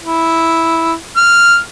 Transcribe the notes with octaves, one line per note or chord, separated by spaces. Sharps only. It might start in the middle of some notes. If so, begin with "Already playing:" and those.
E4
F6